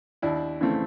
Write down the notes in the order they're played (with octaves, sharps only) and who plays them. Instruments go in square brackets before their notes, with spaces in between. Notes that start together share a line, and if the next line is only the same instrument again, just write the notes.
[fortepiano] D#2 D4 E4
C#3 E3 A3 C4